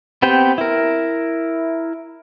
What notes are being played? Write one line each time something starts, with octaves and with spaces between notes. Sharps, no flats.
B3 C4 G4 B4 G5
E4 A#4